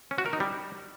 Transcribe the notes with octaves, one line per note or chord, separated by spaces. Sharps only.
C#4
F#4
A#4
D#4
G3